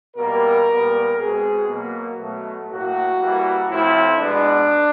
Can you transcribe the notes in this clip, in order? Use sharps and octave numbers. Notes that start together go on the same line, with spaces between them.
B2 G3 A#3 A#4
A#2 G3 B3
B2 G#3 C4 G#4
B2 F#3 A#3
B2 F#3 A3
A2 F#3 A#3 F#4
E3 G3 A#3
A2 F3 A3 C4 E4
B2 G#3 B3 D4